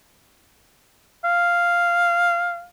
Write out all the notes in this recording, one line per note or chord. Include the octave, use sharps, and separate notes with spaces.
F5